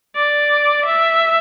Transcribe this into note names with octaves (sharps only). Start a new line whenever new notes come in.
D5
E5